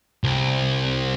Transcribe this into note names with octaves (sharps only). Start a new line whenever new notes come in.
C2